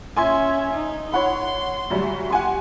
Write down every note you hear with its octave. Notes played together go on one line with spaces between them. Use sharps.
C#4 E5 G#5 C6 G#6
D#4
C#5 F#5 B5 C6
D2 F#3 G3
G4 F#5 G#5 C6